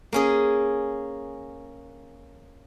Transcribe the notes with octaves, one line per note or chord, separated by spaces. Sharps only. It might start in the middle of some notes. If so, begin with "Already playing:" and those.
A#3 C#4 G#4